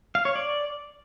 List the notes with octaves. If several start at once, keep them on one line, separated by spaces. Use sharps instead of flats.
F5
C#5
D5